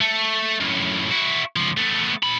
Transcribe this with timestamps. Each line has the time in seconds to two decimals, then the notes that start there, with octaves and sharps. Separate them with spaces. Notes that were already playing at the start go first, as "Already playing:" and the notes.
0.01 A3
0.61 F#2 A2
1.11 E4 F#4
1.56 C#2 F3
1.77 A3 B3
2.23 A#2 B5